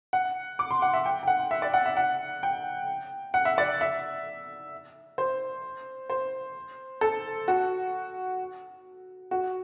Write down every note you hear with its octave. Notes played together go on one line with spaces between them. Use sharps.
F#5
D6
C6
F#5
E5
G5
G5
F#5
E5
D5
F#5
E5
F#5
G5
F#5
E5
D5
E5
C5
C5
A4
F#4
F#4